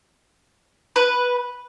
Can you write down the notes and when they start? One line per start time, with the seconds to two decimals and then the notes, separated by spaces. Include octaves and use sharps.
0.96 B4